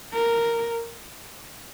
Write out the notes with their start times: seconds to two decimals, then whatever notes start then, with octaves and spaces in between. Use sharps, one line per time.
0.14 A#4